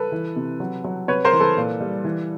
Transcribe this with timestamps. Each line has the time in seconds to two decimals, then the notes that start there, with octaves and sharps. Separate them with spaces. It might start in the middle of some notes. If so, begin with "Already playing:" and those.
Already playing: A4 B4
0.12 E3
0.36 C3
0.60 F#3
0.84 F#3
1.08 C3 B4 C#5
1.25 A#4 C5
1.33 E3
1.40 A4 B4
1.57 A#2
1.81 G3
2.04 E3